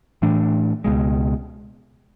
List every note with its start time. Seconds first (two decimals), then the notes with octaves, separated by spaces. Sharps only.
0.22 A2 E3 A3 D4
0.84 C#2 B2 G#3